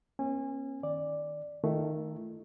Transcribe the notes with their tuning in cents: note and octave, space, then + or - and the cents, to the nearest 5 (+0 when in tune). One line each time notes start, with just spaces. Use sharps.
A#3 +35 C#4 -35 G#5 -25
D#3 +0 D5 +0
D#3 +0 A3 +0 F4 -45